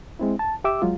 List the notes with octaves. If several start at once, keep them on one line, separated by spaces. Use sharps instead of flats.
G#3 C4 E4
A5
G4 E5 D6 E6
F#3 G#3 F4